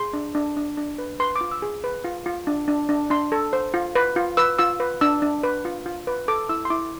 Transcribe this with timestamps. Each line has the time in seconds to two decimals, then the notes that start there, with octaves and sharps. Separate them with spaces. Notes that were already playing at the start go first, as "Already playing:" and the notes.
Already playing: G#4 C6
0.13 D4
0.35 D4
0.57 D4
0.77 D4
0.98 B4
1.20 B4 C6
1.36 D6
1.41 F4
1.52 E6
1.62 G#4
1.84 B4
2.04 F4
2.26 F4
2.47 D4
2.68 D4
2.89 D4
3.10 D4 C6
3.32 A4
3.53 C5
3.74 F4
3.95 B4
4.16 F4
4.37 B4 E6
4.59 F4 E6
4.80 B4
5.01 D4 E6
5.22 D4
5.43 B4
5.65 F4
5.86 F4
6.07 B4
6.28 A4 D6
6.49 E4 E6
6.65 C6
6.70 E4 D6